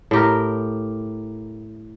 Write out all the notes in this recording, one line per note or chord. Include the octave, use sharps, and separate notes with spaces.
A2 G4 A#4